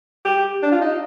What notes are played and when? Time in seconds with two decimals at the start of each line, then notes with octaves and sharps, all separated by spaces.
0.25 G4
0.63 D4
0.72 F4
0.81 D#4